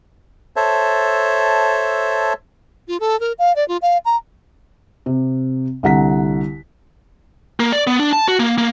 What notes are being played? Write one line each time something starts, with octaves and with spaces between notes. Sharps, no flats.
A4 C5 C#5 E5 A5
F4
A4
A#4
F5
D5
F4
F5
A#5
C3
C2 D3 F#5 A#5 B6
A#3
D5
B3
D4
A5
F#4
A#3
A#3